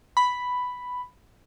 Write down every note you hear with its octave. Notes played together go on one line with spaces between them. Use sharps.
B5